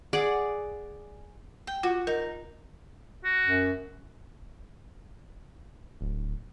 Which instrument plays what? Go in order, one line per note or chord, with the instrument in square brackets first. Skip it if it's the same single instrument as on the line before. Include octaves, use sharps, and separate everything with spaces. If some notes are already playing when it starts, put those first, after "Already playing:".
[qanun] G#4 D5 F#5
[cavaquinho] G5
[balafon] F4 [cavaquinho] F#4
[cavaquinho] D#4 [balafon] A#4
[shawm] F#4
[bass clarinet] F#2
[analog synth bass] D1